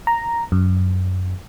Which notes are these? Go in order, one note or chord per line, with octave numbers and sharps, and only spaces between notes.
A#5
F#2